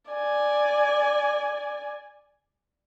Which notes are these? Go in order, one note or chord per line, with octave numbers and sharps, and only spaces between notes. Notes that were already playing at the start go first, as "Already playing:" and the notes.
D5 G#5